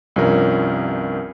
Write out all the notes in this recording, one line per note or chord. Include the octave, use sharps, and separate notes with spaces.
C2 G2 F3 C#4 A#4